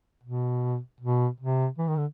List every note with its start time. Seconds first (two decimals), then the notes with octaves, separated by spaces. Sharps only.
0.23 B2
1.01 B2
1.40 C3
1.78 E3
1.88 D#3
1.97 D3